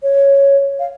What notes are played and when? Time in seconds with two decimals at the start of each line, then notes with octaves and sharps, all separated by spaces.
0.03 C#5
0.79 F5